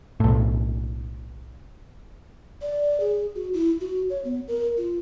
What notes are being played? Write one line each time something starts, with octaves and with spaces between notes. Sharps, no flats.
B1 A2
D5
G#4
F#4
E4
F#4
C#5
B3
A#4
F4